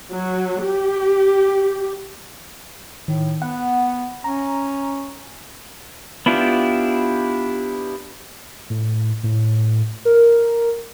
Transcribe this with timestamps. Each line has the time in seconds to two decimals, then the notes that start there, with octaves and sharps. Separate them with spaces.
0.14 F#3
0.64 G4
3.08 A2 D#3
3.42 B3 F#5
4.24 C#4 A#5
6.26 B3 D4 E4 F4 G4
8.70 A2
9.23 A2
10.05 A#4